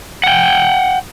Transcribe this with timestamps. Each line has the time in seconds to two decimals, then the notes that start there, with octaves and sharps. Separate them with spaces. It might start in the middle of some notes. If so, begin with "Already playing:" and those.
0.24 F#5 G5